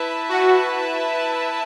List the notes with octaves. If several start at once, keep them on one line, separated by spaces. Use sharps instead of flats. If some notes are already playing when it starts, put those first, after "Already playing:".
Already playing: E4 B4 E5 A5
F#4